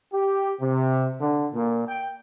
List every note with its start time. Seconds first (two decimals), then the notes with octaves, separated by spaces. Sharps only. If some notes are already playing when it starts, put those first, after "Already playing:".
0.12 G4
0.60 C3
1.20 D3
1.54 A#2
1.88 G5